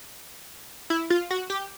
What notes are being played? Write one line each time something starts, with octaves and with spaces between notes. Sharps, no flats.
E4
F4
F#4
G4